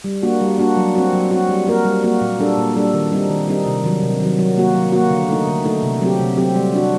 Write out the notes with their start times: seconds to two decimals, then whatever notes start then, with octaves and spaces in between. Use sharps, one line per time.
0.04 G3
0.23 A#3 D4 F#4
0.41 G3
0.58 A#3 D4 F#4
0.77 F#3
0.95 C4 F#4
1.13 F#3
1.31 C4 F#4
1.49 G3
1.67 A#3 F#4 A#4
1.85 G3
2.04 A#3 F#4 A#4
2.21 A#2
2.39 G3 D4 A4
2.58 A#2
2.76 G3 D4 A4
2.94 D#3
3.12 G3 C4 D#4
3.30 D#3
3.48 G3 C4 D#4
3.66 C3
3.84 D#3 F#3
4.02 C3
4.20 D#3 F#3
4.39 F#3
4.57 A#3 F#4
4.75 F#3
4.93 A#3 F#4
5.11 D3
5.29 A3 D#4
5.47 D3
5.65 A3 D#4
5.83 C3
6.01 F#3 C4 G4
6.19 C3
6.37 F#3 C4 G4
6.56 G3
6.74 D4 F#4